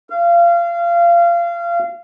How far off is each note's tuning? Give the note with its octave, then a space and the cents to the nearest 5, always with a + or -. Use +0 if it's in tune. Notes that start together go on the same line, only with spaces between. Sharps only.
F5 -25